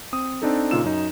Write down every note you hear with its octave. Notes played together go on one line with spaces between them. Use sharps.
C4 D#6
C4 D4 D#4 A4
A#2 C#3 D#4 F4 E6 E7
F#2 D#4